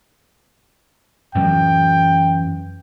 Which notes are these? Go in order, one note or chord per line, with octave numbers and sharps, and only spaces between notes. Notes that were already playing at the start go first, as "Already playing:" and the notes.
F#2 E3 F#3 G5